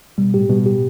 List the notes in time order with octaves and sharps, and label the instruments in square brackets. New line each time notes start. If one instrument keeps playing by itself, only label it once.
[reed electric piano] B2 [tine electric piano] G3
[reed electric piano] A2 [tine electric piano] G4
[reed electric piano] B2 [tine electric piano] G3
[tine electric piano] G4